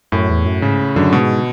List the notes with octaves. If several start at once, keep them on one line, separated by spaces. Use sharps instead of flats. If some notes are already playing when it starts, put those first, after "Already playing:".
F#2 A2
E2
F#2
G#2 C#3
F#2 D3
G#2 B2